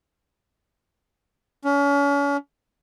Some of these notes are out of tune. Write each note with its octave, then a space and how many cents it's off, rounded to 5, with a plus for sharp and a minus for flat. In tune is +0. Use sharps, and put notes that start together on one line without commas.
C#4 +35